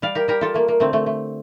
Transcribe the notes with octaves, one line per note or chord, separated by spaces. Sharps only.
G3 D5 F5
G4 A#4
G3 G4 A#4
F4 A4
A3 A#3
A#3
D3 A3 C4
A3
A3